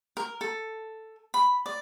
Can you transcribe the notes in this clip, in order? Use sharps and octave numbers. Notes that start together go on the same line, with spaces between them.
A#4
A4
B5
D5